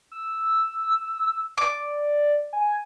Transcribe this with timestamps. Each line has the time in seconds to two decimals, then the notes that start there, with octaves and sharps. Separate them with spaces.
0.12 E6
1.58 D5 D6
2.53 G#5